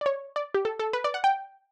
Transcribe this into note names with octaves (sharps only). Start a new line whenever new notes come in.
D5
C#5
D5
G4
A4
A4
B4
D5
F#5
G5